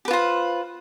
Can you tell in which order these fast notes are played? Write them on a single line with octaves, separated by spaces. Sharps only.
G4 B4 F4 C5